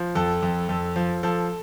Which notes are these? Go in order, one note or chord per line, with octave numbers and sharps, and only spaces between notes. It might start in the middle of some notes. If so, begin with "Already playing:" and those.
Already playing: F3
F2 A4
F2
F2 A4
F3
F3 A4